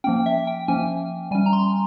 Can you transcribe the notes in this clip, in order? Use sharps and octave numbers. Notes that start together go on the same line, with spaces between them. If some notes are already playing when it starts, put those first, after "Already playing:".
F3 A#3 C#4 G5
E5
G5
F3 A#3 C#4 G#5
G3 C#4 G#5
A#5
C6